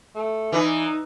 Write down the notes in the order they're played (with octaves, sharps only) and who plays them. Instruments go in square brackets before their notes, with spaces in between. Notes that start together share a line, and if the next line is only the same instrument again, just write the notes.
[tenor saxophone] A3
[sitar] E3 [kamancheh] D#4 [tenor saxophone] D5